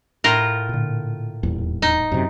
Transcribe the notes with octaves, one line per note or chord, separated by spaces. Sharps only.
A2 F4 A#4
A#2 D3
D#1 E2
D#4
F#2 C3